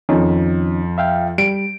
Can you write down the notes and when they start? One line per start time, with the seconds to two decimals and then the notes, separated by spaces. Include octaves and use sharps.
0.09 F2 D#3 C#4 D#4
0.98 E5 F5 G5
1.38 G3 D7